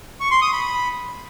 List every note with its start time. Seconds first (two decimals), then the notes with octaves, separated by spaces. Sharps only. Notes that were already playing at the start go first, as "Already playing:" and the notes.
0.20 C#6
0.31 C6
0.42 D#6
0.53 B5